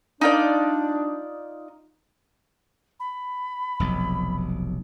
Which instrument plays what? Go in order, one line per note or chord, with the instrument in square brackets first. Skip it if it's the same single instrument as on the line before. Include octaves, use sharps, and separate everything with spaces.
[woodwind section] D4 [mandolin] D#4 F4 D5
[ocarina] B5
[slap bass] F1 B1